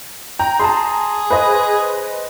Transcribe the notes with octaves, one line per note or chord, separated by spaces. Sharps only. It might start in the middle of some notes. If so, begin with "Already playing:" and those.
G5 A#5
G#4 A5 A#5 C6
B4 C5 D#5